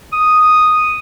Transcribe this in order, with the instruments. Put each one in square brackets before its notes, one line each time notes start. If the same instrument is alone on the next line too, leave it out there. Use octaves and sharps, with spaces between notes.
[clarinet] D#6